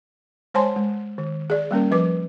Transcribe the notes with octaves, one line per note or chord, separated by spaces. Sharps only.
G#3 C5 C#5 G#5 A5 C6
G#3
D#3
G#4 D5
G3 A#3 C#4 A#4
F3 B4 D6